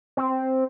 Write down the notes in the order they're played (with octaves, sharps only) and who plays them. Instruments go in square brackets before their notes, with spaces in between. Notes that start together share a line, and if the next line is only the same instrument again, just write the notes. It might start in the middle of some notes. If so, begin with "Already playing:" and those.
[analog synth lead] C4